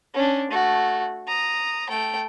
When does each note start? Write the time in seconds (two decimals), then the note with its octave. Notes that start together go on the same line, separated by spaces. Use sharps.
0.14 C#4 D4
0.51 A3 F#4
1.28 A#5 D#6
1.89 A3 G5